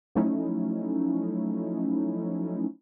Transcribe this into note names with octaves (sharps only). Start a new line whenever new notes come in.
F3 F#3 A3 C#4 D#4 E4